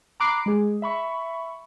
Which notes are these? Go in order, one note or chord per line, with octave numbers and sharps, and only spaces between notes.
A#5 B5 D6 F#6 C7
G#3 G#4
E5 B5 C#6